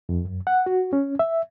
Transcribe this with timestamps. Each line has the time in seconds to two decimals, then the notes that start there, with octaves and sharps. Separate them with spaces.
0.09 F2
0.25 F#2
0.47 F#5
0.66 F#4
0.93 C#4
1.19 E5